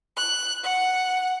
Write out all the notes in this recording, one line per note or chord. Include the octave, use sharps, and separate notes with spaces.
F#6
F#5